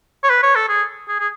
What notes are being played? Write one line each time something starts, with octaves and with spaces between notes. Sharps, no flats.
C#5
B4
C#5
A4
G#4
G#4
G#4